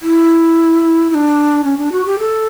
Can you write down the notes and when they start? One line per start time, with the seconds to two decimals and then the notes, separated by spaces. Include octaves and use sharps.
0.02 E4
1.10 E4
1.15 D4
1.64 C#4
1.78 D4
1.92 F#4
2.05 G4
2.19 A4